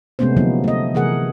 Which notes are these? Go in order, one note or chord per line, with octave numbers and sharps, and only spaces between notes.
C3 G#3 A3 B3 C#4 C5
D3 F3 F#3 A#3 B3 D#4
A3 D#5
C3 E3 A3 G#4 A#4 F#5